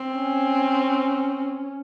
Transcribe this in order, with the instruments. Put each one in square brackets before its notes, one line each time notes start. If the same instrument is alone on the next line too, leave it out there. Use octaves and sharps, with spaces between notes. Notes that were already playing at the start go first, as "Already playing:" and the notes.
Already playing: [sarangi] C4
[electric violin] C#4